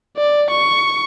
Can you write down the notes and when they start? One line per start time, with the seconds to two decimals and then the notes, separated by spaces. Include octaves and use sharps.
0.17 D5
0.50 C#6